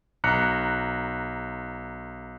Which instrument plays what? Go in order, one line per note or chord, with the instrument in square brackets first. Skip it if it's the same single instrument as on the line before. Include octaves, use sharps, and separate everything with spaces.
[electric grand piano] B1 A#5 F#6 C#7